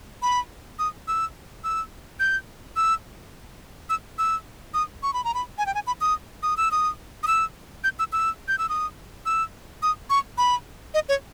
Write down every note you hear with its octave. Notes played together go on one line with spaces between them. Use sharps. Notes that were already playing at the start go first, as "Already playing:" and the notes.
B5
D#6
E6
E6
G6
E6
E6
E6
D#6
C#6
B5
A#5
B5
G#5
G5
G#5
B5
D#6
D#6
E6
D#6
D#6
E6
G6
E6
E6
G6
E6
D#6
E6
D#6
C#6
B5
D#5
C#5